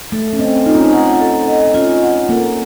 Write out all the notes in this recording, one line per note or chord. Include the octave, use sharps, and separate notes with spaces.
A3 A4
C#4
C4 D#5
D#4 F4
C#4
D#4
F#5
A4
D#5
C#4 F4
F#5
A#3 A4